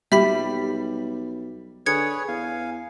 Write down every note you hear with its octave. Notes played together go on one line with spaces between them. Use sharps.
B1 G3 E5 B5 B6
D3 G#4 B4 C#5 G#6 C#7
E2 F5 G#5